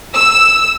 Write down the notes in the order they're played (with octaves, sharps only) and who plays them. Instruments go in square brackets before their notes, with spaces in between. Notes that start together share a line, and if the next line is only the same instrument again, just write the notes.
[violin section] E6